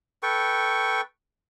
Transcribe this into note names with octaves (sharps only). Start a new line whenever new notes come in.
A4 B4 G5 C#6